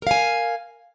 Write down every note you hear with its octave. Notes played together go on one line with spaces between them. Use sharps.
A#4 F5 G#5